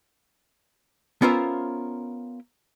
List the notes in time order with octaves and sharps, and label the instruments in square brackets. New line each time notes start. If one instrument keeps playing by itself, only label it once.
[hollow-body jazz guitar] B3 C#4 F4 A#4 C5 E5